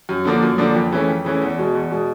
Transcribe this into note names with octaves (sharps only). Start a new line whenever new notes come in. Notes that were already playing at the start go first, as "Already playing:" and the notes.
F#2
D3 F3 A#3 D4
F#2
D3 F3 A#3 D4
F2
C#3 E3 A3 C#4
F2
C#3 E3 A3 C#4
E2
B2 G#3
E2
B2 G#3